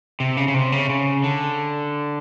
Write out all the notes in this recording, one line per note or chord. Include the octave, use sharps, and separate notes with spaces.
C3
C#3
C#3
C3
C#3
C#3
D3